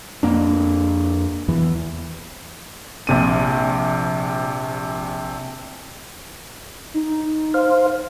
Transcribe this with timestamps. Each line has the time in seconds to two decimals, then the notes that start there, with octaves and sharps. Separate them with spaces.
0.23 F2 A#3 D4
1.48 E2 E3
3.07 A#1 C3 D#7
6.94 D#4
7.54 C5 F5